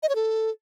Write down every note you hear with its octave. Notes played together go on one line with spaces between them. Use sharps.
D#5
C#5
A4